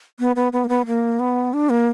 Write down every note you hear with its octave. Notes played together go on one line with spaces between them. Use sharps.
B3
B3
B3
A#3
B3
A#3
B3
D4
A#3